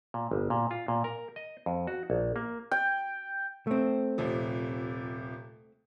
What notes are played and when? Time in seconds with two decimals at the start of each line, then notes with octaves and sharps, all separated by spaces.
0.14 A#2
0.31 G1
0.50 A#2
0.71 F4
0.88 A#2
1.04 A#4
1.36 D#5
1.66 F2
1.87 F#4
2.10 A#1
2.36 A#3
2.71 G5
3.67 A3 C4
4.18 D#1 C3 F3